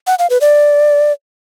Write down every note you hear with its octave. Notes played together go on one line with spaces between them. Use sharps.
F#5
F5
B4
D5